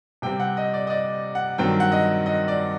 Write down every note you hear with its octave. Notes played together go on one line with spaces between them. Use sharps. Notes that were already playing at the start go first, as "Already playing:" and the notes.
C3 G3 C4 G5
F#5
D#5
D5
D#5
D5
F#5
G2 D#3 F#3 C4 G5
F#5
D#5
D#5
D5